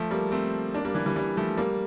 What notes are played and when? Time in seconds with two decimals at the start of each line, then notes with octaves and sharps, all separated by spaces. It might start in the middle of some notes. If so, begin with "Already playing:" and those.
Already playing: F3 A3
0.11 G3 A#3
0.32 A3 C4
0.74 A#3 D4
0.85 G3 A#3
0.95 E3 G3
1.06 E3 G3
1.16 E3 G3
1.37 F3 A3
1.57 G3 A#3